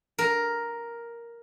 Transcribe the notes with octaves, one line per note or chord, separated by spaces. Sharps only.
A#4